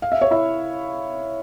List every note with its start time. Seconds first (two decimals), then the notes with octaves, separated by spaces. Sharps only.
0.02 F5
0.12 E5
0.21 C#5
0.31 E4 E5